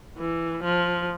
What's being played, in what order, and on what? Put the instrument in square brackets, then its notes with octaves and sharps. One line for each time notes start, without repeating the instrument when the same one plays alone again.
[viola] E3
F3